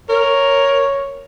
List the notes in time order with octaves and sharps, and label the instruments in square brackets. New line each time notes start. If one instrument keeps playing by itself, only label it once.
[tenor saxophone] A#4 [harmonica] C#5